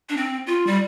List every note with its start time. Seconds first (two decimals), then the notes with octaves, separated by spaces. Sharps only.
0.09 D4
0.17 C4
0.47 F4
0.67 G3